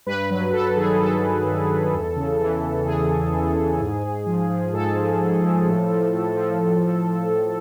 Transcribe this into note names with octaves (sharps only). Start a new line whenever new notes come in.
G2 B4
F#3 B4
G2 A4
D#3 G#4
F#3 A4
G2
G2
G2
E2
C#3
E3
E2
E2 G#4
E2
E2
E2
G#2
G#2
F3
F3
G#2 A4
F3
G#2
F3
A2
F3
A2
F3
A2
F3
F3
A2